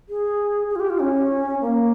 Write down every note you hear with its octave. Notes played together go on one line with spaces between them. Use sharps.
G#4
G#4
F4
G4
F4
C#4
A#3